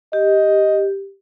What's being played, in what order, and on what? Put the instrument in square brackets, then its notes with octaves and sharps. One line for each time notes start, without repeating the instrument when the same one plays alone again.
[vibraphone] G4 [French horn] D#5